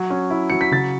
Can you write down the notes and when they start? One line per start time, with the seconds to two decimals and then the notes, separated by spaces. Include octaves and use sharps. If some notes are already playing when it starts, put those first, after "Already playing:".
Already playing: F#3
0.10 C#4
0.30 E4
0.50 F#3 C#7
0.61 B6
0.72 C#3 A6